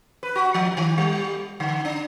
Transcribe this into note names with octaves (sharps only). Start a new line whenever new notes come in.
B4
F#4
F3
D#3
G3
D3
D4